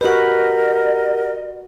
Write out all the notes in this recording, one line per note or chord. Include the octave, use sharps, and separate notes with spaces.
F#4 G4 A#4 B4 D#5 F#5